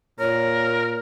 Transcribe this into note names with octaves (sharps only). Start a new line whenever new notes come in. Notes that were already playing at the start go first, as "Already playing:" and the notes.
A#2 A#4 C#5